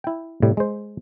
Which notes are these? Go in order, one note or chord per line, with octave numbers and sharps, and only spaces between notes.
E4 G5
A2 C3 G3
G#3 C5